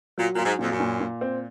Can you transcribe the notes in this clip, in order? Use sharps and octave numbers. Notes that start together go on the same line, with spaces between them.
A#2 F#3
A#2 F#3
G#2
F2 A#2
F#2
A#2
A#2
C4